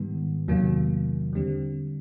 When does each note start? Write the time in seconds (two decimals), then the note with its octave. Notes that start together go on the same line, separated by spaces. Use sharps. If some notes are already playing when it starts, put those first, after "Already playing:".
Already playing: G#2 D#3 G3 B3
0.48 E2 C3 D#3 F#3 A#3
1.33 D3 G3 C4